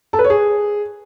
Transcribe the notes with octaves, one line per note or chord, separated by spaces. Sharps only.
A4
B4
C#5
G#4